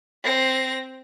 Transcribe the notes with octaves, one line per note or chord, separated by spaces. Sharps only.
C4 A#6